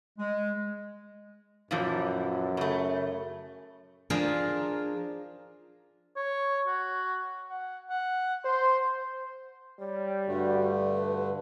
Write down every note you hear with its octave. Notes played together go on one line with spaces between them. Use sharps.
G#3
F#2 A#2 E3 F3
C#3 A3
F3 D4 F4 G#4 A#4
C#5
F#4
F#5
F#5
C5 C6
G3 C#5
G2 D3 A3 F#4
B4